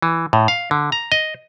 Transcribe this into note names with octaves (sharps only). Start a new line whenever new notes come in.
E3
A2
F5
D3
A#5
D#5